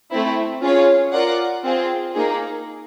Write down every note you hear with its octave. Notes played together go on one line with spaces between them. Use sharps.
A3 C4 E4
C#4 F4 G#4 C#5
F4 A#4 D5 F#5
C4 F4 G#4
A#3 D#4 G#4